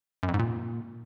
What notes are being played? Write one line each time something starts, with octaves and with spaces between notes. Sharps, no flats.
F#2
F2
G#2
A#2